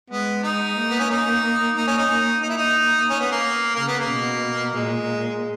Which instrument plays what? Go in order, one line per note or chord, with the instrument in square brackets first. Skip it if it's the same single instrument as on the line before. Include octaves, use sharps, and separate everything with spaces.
[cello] G#3 [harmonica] B3
[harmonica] D#4
[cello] A#3
[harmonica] B3
C#4
D#4
[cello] A#3 [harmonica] D#4
[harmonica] C#4
D#4
[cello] A#3
[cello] A#3 [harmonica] D#4
[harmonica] E4
D#4
C#4
B3
A#3
[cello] C#3 [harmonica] A#3
[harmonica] B3
A#3
[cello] B2
[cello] A#2 [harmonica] G#3